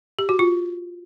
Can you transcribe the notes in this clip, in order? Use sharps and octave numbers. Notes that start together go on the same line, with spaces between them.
G4
F#4
F4